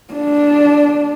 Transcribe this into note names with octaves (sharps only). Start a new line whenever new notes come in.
D4